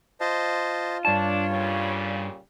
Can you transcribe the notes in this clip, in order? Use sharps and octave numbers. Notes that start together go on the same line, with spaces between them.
F4 C5 D#5 A5
G2 D4 C#5 A5
A#2 C#3 G3